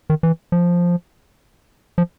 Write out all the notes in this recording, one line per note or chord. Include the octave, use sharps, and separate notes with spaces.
D#3
E3
F3
F3